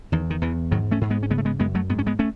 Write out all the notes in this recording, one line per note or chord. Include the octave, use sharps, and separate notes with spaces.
E2 D#3
D#3
E2 E3
G#2 D#3 F#3
A3 C#4
G#2
G#3 B3
C#4
C#3 G#3 B3
A3
G#3 B3
F#2 G#3 B3
F#3 A3
G#2 B3
C#4
G#3 B3
A3 C#4